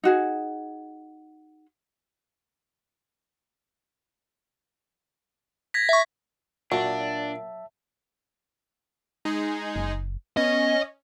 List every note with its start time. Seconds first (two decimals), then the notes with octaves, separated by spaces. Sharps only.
0.04 D#4 F#4 G#4
5.74 G#6 A#6 B6
5.89 E5 C#6
6.72 A#2 F#3 D4 E5 A5
9.25 G#3 D#4 G#4
9.76 F#1
10.37 B3 C#4 D#5